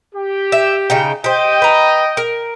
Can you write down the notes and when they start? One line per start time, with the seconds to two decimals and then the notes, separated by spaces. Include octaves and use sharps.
0.15 G4
0.52 E5
0.90 C#3 D#4 G5
1.24 G4 C5 D#5 G5
1.62 B4 A#5
2.17 A#4